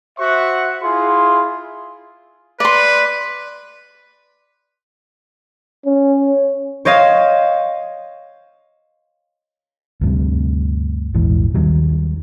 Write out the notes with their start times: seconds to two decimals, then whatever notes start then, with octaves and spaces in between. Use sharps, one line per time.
0.19 F#4 C5 E5 F#5 C#6
0.82 E4 F4 G#4 C6
2.60 B4 D5 C6
5.86 C#4
6.85 C5 C#5 D#5 F5
10.01 D2 G2 C3
11.14 A#1 E2 G#2 E3
11.54 D#2 D#3 F#3 G3